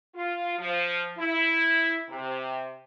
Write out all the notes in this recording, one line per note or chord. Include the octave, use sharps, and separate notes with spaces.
F4
F3
E4
C3